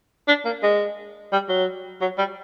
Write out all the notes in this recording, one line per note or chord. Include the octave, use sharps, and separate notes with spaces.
D4
A#3
G#3
G3
F#3
F#3
G3